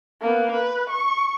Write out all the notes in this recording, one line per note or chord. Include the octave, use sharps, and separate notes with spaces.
A#3 B3
B4
C#6